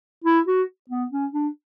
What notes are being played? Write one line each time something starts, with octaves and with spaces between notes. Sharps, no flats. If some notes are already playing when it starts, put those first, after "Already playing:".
E4
F#4
B3
C#4
D4